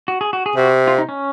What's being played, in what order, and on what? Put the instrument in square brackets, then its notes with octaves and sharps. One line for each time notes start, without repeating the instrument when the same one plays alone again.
[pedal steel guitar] F#4
G#4
F#4
G#4
[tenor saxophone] C3 [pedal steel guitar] F#4
[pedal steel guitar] F4
D#4
C#4